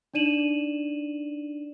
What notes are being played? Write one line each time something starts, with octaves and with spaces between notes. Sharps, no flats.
D4 D#4 D5 D#7 E7 F#7